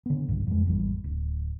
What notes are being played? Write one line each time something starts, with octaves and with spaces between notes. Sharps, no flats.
D3 B3
E1 B1 G2
F2 G#3
G#1 E2 E3 G3
D1